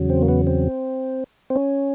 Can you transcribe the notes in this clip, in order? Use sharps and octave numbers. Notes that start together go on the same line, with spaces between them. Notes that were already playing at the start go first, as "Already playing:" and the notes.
Already playing: E2 C#3 F#3
C4
A#3
B3
C4
C4
C#4